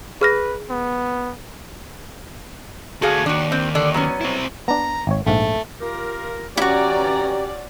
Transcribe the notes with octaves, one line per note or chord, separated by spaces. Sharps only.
G#4 B4 F6 A#6
B3
D2 F#4 G#4 A4 F5
D#2 D4 F#4
C4
D3 D4
F#3 B3 C#4
C4 E4
B3 D4 A#5
G#1 C#5
A#1 G#2 A3
F4 G4 A#4
E3 C#4 E4 F#4 G4 D5 A#5